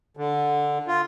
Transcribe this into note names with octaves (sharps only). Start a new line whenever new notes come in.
D3
F4